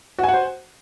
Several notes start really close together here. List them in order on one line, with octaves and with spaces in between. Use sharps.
F#4 G#5 F#5 C5